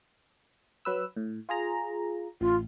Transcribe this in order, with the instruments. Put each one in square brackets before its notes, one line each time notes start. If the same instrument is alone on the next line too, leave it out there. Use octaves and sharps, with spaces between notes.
[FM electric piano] F#3 B4 E6
A2
F4 G#4 A#5
[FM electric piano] A1 [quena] F4